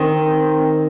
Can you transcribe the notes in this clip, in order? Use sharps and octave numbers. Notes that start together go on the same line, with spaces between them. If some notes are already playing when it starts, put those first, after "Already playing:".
Already playing: D#3 C4